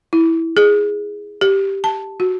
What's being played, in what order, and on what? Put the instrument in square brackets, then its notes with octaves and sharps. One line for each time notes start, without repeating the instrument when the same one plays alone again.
[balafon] E4
G#4
G4
A5
F#4